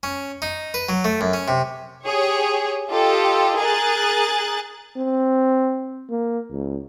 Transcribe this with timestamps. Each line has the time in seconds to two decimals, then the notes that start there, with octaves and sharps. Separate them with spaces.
0.03 C#4
0.42 D#4
0.74 B4
0.89 F#3
1.05 A3
1.21 F#2
1.34 C#4
1.48 C3
2.04 G4 G#4 C#5
2.90 F4 G4 A4 D#5
3.57 G#4 A#4 G#5 F#6 A6
4.97 C4
6.11 A#3
6.51 C#2